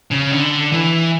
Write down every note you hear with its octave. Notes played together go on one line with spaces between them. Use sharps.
C#3
D3
E3